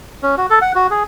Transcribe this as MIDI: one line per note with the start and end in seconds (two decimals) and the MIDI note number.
0.23 0.35 61
0.37 0.46 66
0.50 0.59 69
0.61 0.72 78
0.75 0.87 66
0.90 1.03 68